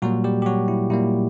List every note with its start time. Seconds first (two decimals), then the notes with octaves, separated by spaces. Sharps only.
0.02 A#2 F#3 G3 A#3 F#4
0.24 G3 G4
0.42 G4
0.46 F#3 F#4
0.68 E4
0.90 A#2 G3 A#3 E4